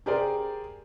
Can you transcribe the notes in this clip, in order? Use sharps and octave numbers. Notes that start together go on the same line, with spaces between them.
G4 G#4 A#4 C5 D5